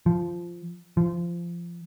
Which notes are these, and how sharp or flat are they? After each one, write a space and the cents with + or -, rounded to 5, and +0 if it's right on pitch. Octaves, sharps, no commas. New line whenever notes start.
F3 -10
F3 -20